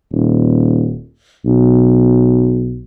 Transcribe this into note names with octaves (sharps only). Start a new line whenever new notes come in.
D#1
B1